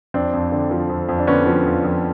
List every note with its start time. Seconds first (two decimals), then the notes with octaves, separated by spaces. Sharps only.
0.14 F2 C4 D4
0.34 F2
0.52 D3
0.71 F3
0.89 F2
1.09 F2
1.18 D4
1.27 D3 B3 C#4
1.46 F3
1.65 F2
1.84 F2